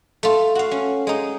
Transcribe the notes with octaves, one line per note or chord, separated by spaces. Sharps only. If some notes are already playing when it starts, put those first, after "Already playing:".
A3 F4
F#4 F5
C#4
G#3 D#4